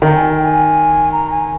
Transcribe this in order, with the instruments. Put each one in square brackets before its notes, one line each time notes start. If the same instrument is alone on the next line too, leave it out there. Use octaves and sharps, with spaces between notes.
[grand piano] D#3 [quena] A#5
[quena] G#5
G5
G#5
A#5
G#5